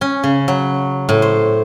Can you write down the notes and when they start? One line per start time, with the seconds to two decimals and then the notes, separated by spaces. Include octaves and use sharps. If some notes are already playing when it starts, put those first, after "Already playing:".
0.01 C#4
0.24 C#3
0.48 F#3
1.09 A2
1.22 C5